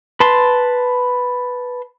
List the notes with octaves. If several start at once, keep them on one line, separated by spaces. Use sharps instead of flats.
B4 A5 C6